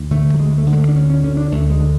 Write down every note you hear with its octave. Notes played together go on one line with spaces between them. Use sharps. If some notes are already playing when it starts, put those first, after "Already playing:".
Already playing: D2
D3 A3
F#3
D2 G#3
A3
D3
G#3
A3
D4
D2 C#4
C#4
D3 C#4
D4
D2 A3
G#3
D3